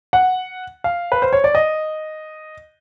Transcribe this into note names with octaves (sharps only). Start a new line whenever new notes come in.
F#5
F5
B4
C5
C#5
D5
D#5